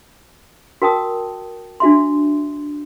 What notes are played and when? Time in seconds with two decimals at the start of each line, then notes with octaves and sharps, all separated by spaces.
0.82 F#4 A#4 G5 A5 D#6
1.80 D4 F#4 E5 C6